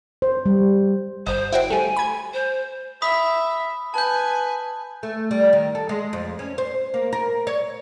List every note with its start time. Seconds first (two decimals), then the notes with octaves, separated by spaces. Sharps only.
0.22 C5
0.46 G3
1.26 G1 C5 D#5
1.52 E4 F#4 C5 G5
1.70 G3 A3 G#5
1.96 B5 G#6
2.33 C5
3.02 E5 B5 D#6 B6
3.94 B4 G#5 A5 G6
5.03 A3
5.31 G3
5.53 D#3
5.75 A4
5.89 G#3
6.13 F2
6.39 C#4
6.58 C5
6.94 A#3
7.13 A#4
7.47 C#5